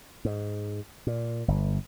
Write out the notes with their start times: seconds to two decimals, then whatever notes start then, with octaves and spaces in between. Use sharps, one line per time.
0.25 G#2
1.07 A#2
1.48 G1